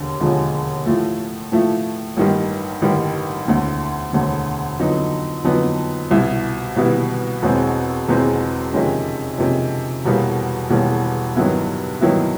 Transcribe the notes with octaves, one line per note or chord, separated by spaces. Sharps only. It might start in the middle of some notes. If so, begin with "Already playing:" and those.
Already playing: E1 D#2 D3
E1 D#2 D3 F3 G#3
A2 F3 A3
A2 F3 A3
A1 G2 D#3 G3
A1 G2 D#3 G3
E1 D2 D3
E1 D2 D3
F2 D3 F#3 B3 D#4
F2 D3 F#3 B3 D#4
C2 B2 G3 B3 E4
C2 B2 G3 B3 E4
E1 E2 B2 G#3 C4
E1 E2 B2 G#3 C4
F2 C3 D#3 G#3 C#4
F2 C3 D#3 G#3 C#4
E1 E2 B2 G3 A#3
E1 E2 B2 G3 A#3
G2 D#3 F#3 B3 E4
G2 D#3 F#3 B3 E4